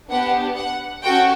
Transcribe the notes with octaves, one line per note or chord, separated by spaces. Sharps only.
B3 D4 G4 F#5
F#5
C#4 F#4 A4 G5